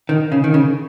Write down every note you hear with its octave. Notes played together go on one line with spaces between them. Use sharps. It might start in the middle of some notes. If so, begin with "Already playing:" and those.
D#3
C#3
D#3
C#3